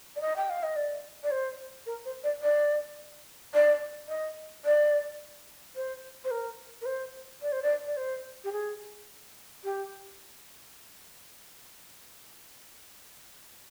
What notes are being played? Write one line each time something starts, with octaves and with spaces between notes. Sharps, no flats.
D5
D#5
G5
F5
D#5
D5
D5
C5
A#4
C5
D5
D5
D5
D#5
D5
C5
C5
A#4
A#4
C5
D5
C5
D5
D5
C5
G4
G#4
G4